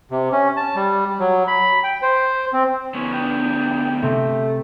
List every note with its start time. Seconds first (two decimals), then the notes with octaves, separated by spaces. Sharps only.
0.11 C3
0.32 C#4
0.57 A5
0.76 G3
1.20 F#3
1.48 B5
1.84 G5
2.02 C5
2.53 C4
2.94 D2 B3 C#4
3.13 D4 G5
4.02 C3 A3 C4